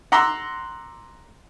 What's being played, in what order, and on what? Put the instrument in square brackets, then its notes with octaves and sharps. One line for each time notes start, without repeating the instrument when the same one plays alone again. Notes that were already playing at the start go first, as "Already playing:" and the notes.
[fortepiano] F#5 A#5 C6 D6 E6